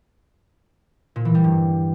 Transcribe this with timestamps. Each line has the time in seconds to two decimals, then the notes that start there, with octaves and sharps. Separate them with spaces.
1.16 A#2
1.25 E3
1.35 G3
1.44 G2